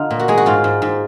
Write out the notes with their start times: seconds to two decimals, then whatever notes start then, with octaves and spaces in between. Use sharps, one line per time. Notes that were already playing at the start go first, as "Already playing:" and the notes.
Already playing: D3 D#4 F4
0.11 A#2
0.19 F#4
0.28 G#3 G#4
0.37 F#4
0.46 G#2 F4
0.64 G#2
0.82 G#2